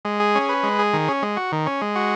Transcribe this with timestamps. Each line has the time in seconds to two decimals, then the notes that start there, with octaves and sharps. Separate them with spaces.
0.05 G#3
0.20 G#4
0.35 C#4
0.49 B4
0.63 G#3
0.79 G#4
0.93 D#3
1.08 C#4
1.22 G#3
1.37 F#4
1.52 D#3
1.66 C#4
1.82 G#3
1.96 F#4